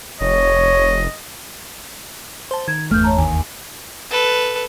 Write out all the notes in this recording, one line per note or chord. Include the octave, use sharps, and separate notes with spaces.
F1 C#5 D#5
C5 A5
D#3 G#6
G1 E2 A3 F6 G6
C#5 A5 A#5
D#2 G#5
A4 B4